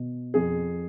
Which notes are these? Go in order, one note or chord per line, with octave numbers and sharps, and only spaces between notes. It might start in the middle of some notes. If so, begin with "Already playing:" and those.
Already playing: B2
F2 G#4